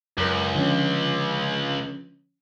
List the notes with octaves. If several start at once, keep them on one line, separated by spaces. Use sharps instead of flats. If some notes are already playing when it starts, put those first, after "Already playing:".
C#2 F#2 A#4
D3 F3 C#4